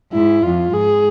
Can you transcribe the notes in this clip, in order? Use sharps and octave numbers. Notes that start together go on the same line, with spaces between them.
G#2 E4
F2 F4
G#2 G#4